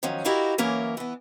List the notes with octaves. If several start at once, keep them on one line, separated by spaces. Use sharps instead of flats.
D#3 F3 F#3 C#4
E4 F#4 G4 A#4 D#5 F5
F#2 E3 A#3 C#4 A#4 E5
E3 B3